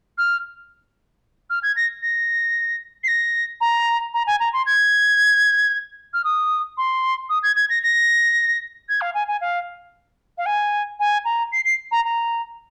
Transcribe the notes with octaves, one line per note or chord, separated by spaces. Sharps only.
F6
F6
G#6
A#6
A#6
C7
A#6
A#5
A#5
G#5
A#5
C6
G#6
F6
D#6
C6
D#6
G#6
G#6
A#6
A#6
G#6
F5
G#5
G#5
F5
F5
G#5
G#5
A#5
C7
C7
A#5
A#5